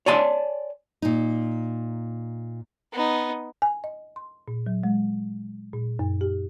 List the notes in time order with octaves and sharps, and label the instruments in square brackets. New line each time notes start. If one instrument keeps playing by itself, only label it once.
[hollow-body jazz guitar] C#5 D5 G#5 A5 C6
[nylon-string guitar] A#2 D#4
[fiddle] B3 D#4
[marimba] G#5
D#5
C6
A#2
F#3
G#3
A#2
F#2
G4